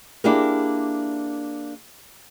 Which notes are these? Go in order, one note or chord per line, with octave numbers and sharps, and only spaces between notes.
A#3 D4 E4 G4 G#4 A#4